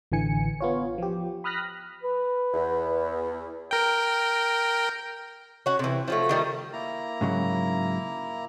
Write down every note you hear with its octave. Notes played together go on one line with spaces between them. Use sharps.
A1 D3 E3 G#5 C#7
B3 F4 C#5
F3 G4
B5 D#6 F6 F#6 A#6 B6
B4
E2
A#4 G5
C#4 F#4
C3 E3
F3 F#3 A3
D#3 G3 A3
A#3 E4 A#5
G#2 C#3 F#3